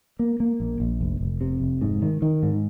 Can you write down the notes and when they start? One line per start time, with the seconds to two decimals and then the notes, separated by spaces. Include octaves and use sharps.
0.19 A#3
0.40 A#3
0.60 A#1
0.80 A#1
1.01 F1
1.21 F1
1.41 C3
1.61 F1
1.82 G#2
2.02 D#3
2.22 D#3
2.43 G#2